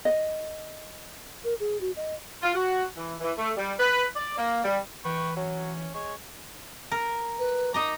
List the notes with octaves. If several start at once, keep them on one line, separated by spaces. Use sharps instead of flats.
D#5
A#4
G#4
F#4
D#5
F4
F#4
E3
E3
A3
G3
B4
D5
A#3
G3
E3 B4 G5 C#6
F#3 C#4
G#3 C#5
A#4
B4
D#4 D#5 A#5 D6